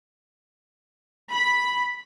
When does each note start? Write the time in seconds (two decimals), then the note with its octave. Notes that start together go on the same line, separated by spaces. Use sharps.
1.30 B5